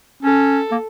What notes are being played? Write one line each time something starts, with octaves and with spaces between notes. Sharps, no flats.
C#4 A4
A#3